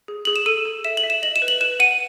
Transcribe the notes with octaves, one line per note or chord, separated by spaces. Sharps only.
G#4
G#4 F#7
E7
A4 D#7
A4
E5 E7
F#7
E5
E7
D#5 F#7
E7
B4
F#7
B4 E7
F#5 D#7